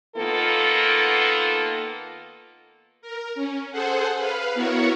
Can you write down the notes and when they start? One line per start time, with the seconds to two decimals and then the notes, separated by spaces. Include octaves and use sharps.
0.17 D#3 A#3 B3 F4 A4
3.02 A#4
3.35 C#4
3.72 G#4 A4 C5 F#5
4.17 B4 F5
4.55 B3 E4 F#4 A#4 C#5 F#5